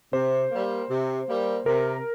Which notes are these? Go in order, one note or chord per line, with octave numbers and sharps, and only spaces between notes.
C3 C5
G3 A#3
C3
G3 A#3
C3 A#4